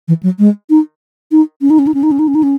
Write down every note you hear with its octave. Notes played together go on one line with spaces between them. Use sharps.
E3
F#3
G#3
D#4
D#4
C#4
D#4
C#4
D#4
C#4
D#4
C#4
D#4
C#4
D#4
C#4